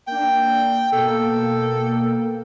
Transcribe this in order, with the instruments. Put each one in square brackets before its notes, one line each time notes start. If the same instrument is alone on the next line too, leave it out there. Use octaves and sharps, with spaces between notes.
[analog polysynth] A#3 D4 [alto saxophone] G5
[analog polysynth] B2 A#3 G5 [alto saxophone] A4